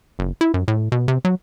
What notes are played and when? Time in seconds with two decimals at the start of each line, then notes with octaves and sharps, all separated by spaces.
0.19 F#1
0.41 E4
0.54 F#2
0.68 A2
0.92 B2
1.08 C3
1.25 F#3